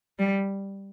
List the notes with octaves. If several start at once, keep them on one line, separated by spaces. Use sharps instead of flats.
G3